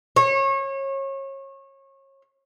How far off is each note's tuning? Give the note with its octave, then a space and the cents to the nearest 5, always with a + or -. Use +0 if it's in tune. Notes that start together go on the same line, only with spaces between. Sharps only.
C#5 -30